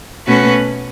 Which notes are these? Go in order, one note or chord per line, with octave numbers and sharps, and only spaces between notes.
B2 A3 C#4 F#4 B4